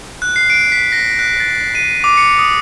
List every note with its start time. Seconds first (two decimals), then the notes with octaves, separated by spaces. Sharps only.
0.22 F#6
0.36 C7
0.50 D7
0.72 B6
0.92 A#6
1.19 F#6
1.40 A6
1.75 D#7
2.04 D6
2.17 C#7
2.39 D#6